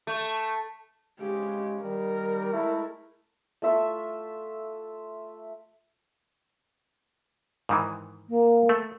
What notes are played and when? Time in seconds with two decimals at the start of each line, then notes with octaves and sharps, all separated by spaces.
0.07 A3
1.20 G#2 C#3 G#3 G4
1.83 D#3 G3 A#4
2.53 G#3 A3 E4
3.62 A3 F4 E5 C#6
7.69 G#2 D#3 E3
8.29 A#3
8.69 A3